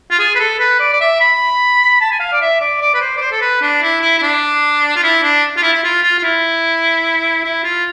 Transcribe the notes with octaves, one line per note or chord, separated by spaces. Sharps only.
F4
G#4
B4
A4
B4
D5
D5
E5
B5
A5
G#5
F5
D5
E5
D5
D5
B4
C5
D5
C5
A4
B4
D4
E4
E4
E4
D4
F4
E4
D4
F4
E4
E4
F4
F4
F4
E4
E4
F4